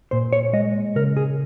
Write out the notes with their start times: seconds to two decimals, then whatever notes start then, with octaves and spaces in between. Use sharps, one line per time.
0.11 A#2 C5
0.33 C#5
0.53 G#3 D#5
0.96 C#3 A#4
1.17 G#4